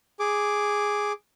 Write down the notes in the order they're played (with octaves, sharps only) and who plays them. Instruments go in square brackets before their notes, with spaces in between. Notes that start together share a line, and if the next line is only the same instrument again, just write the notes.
[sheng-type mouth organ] G#4 D6